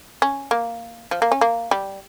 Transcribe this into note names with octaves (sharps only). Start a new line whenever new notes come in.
C#4
A#3
F3
A#3
C#4
A#3
G3